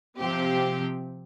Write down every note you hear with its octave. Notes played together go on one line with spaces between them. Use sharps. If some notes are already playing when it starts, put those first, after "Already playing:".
C3 F3 C4 G4